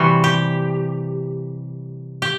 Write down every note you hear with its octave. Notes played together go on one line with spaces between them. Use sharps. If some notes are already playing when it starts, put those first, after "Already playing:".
Already playing: C3 E3 G3 F#4
G4
G4